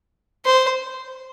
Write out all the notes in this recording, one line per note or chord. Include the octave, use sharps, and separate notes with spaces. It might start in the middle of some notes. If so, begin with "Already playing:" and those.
C5